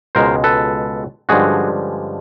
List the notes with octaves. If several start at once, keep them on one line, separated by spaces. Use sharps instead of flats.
C#2 B2 G#3 A#4 C5
A4 B4
G2 D3 F3 G#3 C#4 F#4 G#4